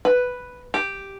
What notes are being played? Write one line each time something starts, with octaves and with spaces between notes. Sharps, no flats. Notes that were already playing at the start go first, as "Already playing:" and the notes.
B4
G4